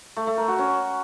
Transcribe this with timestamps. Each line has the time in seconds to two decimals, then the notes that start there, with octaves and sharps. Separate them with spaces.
0.17 A3
0.27 A3
0.38 A#4
0.48 F#4
0.59 C#4